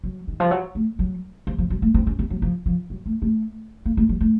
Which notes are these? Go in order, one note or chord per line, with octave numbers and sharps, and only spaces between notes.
F#3
D#3
F3
F#3
A3
F#3
F3
F3
F#3
A3
C4
C#4
C4
F#3
F3
F3
F#3
A3
A3
A#3
A3
F#3
A3